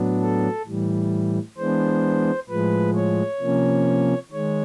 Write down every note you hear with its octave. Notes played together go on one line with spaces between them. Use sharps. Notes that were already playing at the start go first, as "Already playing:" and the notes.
Already playing: A2 F#3 B3 D4
A4
A2 E3 G3
E3 G#3 B3 D4 C5
A2 F3 G#3 B4
C#5
C3 F3 A#3 C#4
D#3 G#3 C#5